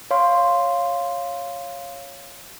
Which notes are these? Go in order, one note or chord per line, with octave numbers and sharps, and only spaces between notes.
C#5 F5 C6